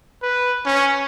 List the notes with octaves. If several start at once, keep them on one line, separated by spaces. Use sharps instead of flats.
B4
C#4